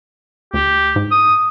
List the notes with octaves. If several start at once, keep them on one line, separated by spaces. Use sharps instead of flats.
D2 G4
G#2
D#6